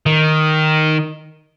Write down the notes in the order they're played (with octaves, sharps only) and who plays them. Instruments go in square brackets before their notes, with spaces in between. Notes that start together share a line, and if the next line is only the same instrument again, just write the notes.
[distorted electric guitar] D#3